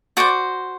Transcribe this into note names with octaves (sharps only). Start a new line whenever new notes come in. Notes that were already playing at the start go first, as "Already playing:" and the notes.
F#4 C5 D5 D6